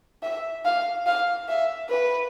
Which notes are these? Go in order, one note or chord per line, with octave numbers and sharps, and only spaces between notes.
E5
F5
F5
E5
B4